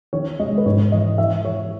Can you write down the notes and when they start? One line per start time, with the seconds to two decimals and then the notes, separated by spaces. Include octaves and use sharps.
0.13 D#3 C#5
0.39 G#3 D#5
0.58 B4
0.66 G#2 C#5
0.92 E3 D#5
1.18 E3 E5
1.45 E3 C#5